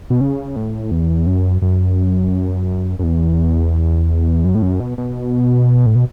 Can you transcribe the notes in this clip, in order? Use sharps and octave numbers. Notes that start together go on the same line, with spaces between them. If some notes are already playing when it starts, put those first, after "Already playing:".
B2
C#3
A2
E2
F#2
F#2
F#2
E2
F#2
A2
F#2
B2
B2
A2
B2